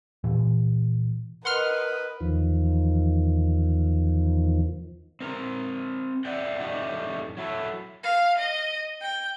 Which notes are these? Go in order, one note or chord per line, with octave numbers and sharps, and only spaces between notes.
A#2 E3
A#4 B4 D#5 F#5 C6 F6
E2 D#3 F3
C4 A#4 A#5
D5 E5 F#5 G5
F#2 A2 A3 D#4 G4 D5
F#3 E4 A4
F5
D#5
G5